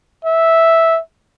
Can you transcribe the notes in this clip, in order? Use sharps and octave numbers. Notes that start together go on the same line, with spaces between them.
E5